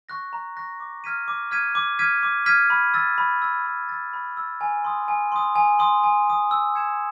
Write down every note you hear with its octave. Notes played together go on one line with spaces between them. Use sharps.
C#6 F#6 A#6
A#5
C#6 F#6 A#6
D6
F6 G#6 B6 D#7
D6
F6 G#6 B6 D#7
D6
F6 G#6 B6 D#7
D6
F6 G#6 B6 D#7
B5
E6 A6
B5
E6 A6
B5
E6 A6
B5
E6 A6
G#5
C6 D#6
G#5
C6 D#6
G#5
C6 D#6
G#5
C6 D#6
E6
G#6 C#7 E7